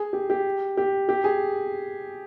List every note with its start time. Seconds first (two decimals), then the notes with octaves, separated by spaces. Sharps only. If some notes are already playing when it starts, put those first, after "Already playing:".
Already playing: G#4
0.13 G4
0.30 G4
0.77 G4
1.09 G4
1.24 G#4